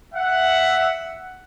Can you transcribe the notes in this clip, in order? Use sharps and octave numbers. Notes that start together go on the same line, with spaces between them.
E5 F#5